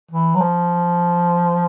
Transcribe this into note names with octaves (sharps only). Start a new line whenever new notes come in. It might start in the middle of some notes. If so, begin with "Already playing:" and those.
E3
F#3
F3